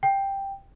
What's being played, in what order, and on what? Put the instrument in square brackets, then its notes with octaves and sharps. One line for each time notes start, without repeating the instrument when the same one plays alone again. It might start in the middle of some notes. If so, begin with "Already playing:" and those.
[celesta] G5